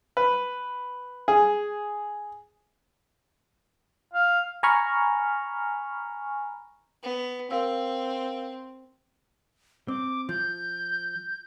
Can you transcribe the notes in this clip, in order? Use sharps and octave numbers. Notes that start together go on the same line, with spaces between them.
B4
G#4
F5
G#5 A#5 B5 C#6 F6
B3
C4 A#4 F5 E6
C4 D6
F3 G6